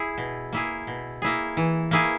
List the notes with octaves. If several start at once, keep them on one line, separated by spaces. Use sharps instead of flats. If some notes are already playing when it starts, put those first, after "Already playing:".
Already playing: E4 G#4
B2
A#3 E4 G#4
B2
A#3 E4 G#4
E3
A#3 E4 G#4